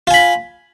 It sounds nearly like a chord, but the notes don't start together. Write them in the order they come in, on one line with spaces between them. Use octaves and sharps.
F4 G#5 B5